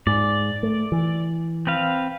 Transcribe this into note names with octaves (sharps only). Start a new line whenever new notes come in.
G#2 D5
A3
E3
C4 B4 F5